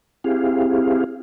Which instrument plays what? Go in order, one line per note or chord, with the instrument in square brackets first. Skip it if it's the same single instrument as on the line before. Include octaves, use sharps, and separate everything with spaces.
[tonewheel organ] C4 E4 G4 G#4 F5